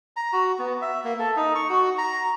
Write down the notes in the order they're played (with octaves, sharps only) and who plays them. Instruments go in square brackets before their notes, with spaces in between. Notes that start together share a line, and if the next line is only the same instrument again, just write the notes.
[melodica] A#5
F#4
B3
E5
A#3
A4
D#4
C#6
F#4
A#5